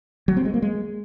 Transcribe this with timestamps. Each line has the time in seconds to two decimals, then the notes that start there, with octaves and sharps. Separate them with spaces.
0.28 F#3
0.37 C4
0.45 G#3
0.54 A#3
0.62 G#3